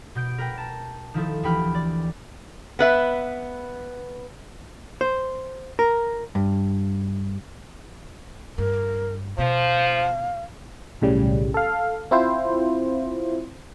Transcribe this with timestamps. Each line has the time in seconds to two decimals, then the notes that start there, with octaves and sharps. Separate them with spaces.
0.15 B2 G6 D7
0.38 A#4 B4 G5
0.58 A5 A#5
1.14 D#3 F3 E4 A4
1.43 D2 E3 G4 G5 B5 F6
1.75 D5
2.79 B3 B4 E5
5.01 C5
5.79 A#4
6.35 G2
8.58 G2 A#4
9.38 B2 F3 C5 F5
11.01 B1 A2 C#3 G3
11.54 A4 F5
12.11 C4 E4 F4 C5